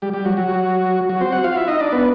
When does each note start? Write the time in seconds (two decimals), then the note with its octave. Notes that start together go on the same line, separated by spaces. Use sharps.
0.02 G3 G4
0.13 G3 G4
0.25 F#3 F#4
0.37 F#3 F#4
1.09 F#3 F#4
1.21 C4 C5
1.32 F#4 F#5
1.44 F4 F5
1.56 E4 E5
1.68 D#4 D#5
1.80 D4 D5
1.92 B3 B4